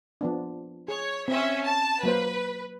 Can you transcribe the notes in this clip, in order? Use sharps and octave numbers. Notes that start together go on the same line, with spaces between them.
F3 B3 D4
G#4 C#5
C4 C#4 E5
A5
F#3 A#3 B4 C5